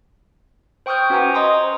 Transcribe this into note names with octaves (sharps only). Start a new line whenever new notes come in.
C5 G5 C#6 D#6 F6 G6
C#4 F#4 B4 F#5 G#5 A#5
D#5 A#5 C6 D#6
C5